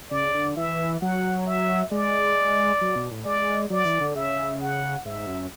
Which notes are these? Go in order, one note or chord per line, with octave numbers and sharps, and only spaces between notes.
C#3 D5
D3
E3 E5
F#3 F#5
E5
G#3 D5
F#3
B2
A2
G#3 D5
F#3 D5
E3
D3
C#3 E5
F#5
G#2 E5
F#2